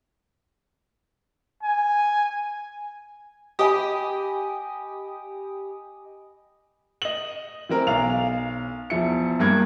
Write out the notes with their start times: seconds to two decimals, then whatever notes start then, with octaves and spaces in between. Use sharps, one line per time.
1.63 G#5
3.59 G4 D#5 G5 G#5 B5 D#6
7.02 D#5 F#7
7.69 E3 C4 A#4
7.87 B1 F5 F7
8.90 E2 F3 E4 C#7
9.40 G2 A#3 G#6